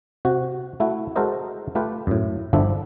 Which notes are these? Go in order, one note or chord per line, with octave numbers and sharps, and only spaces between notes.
C3 F#4
A3 E4 F#4 F#5
G#3 F#4 A4 A#4 C5 D#5
A3 F4 G4 B4
F#2 A2
G1 D3 F3 D4 E4 E5